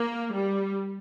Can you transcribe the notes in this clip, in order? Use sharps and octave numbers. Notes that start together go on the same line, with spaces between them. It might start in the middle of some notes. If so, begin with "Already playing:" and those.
Already playing: A#3
G3